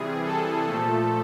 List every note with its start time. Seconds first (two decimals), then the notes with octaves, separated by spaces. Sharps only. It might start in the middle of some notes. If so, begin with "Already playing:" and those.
Already playing: C3 E3 G3 G#4
0.24 A4
0.66 A#2 F3 A3